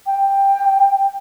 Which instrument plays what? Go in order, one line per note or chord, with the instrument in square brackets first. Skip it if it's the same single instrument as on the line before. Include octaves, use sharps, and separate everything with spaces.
[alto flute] G5